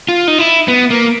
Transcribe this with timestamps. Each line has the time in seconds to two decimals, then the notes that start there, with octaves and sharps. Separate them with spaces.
0.09 F4
0.28 D#4
0.39 E4
0.68 B3
0.91 A#3